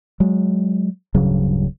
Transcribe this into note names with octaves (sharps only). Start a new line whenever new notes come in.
F#3 G#3
D1 G2 C#3 F#3